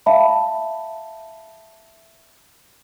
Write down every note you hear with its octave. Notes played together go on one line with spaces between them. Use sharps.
E5 F5 A5 B5